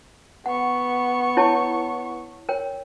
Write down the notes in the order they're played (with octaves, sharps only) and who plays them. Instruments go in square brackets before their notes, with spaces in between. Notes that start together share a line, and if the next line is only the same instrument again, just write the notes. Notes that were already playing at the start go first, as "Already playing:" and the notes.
[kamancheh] B3 C#6 [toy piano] F#5
[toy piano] E4 C#5 A5
A#4 C#5 G5